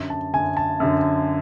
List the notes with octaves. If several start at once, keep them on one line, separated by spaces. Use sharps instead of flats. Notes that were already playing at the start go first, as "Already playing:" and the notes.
Already playing: F#2 D3
A5
F#2 D3 G#5
A5
F#2 D3